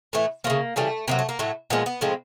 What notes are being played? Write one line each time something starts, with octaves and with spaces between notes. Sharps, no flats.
A2 E3 A3
F3 A3 A#3
C#3
C#3 E3 G3 A3
C3 D#3 F#3 A#3
A3
A#3
A2 F#3 A3
A#2 F3 G#3 B3
B3
A2 F3 G#3 C4